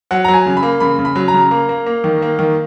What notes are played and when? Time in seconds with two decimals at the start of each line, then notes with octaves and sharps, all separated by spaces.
0.11 F#3 F#5
0.24 F#3 A#5
0.34 G#5
0.46 C#3
0.57 B5
0.63 A#3
0.80 C#3 B5
0.99 C#3
1.05 B5
1.15 F#3
1.28 A#5
1.34 C#3
1.51 A#3
1.69 A#3
1.86 A#3
2.04 D#3
2.22 A#3
2.39 D#3